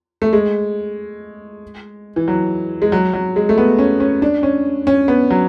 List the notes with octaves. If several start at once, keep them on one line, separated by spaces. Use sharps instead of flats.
A3
G#3
E3
F#3
G#3
F#3
F#3
G#3
A3
B3
C#4
C#4
D4
C#4
C#4
B3
F#3